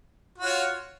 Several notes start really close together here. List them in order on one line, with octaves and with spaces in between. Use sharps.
F#4 F4 C#5